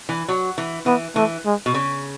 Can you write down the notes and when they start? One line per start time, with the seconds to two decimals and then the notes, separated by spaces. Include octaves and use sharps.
0.09 E3
0.28 F#3
0.58 E3
0.86 E3 B3
1.16 E3 A3
1.46 G#3
1.66 B2
1.74 C#3